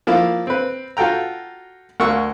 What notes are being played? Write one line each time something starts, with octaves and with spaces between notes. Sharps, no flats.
F3 A#3 E4
C4 B4
F4 F#4 A4 G5 A#5
D2 A#4 F#5 C#6 E6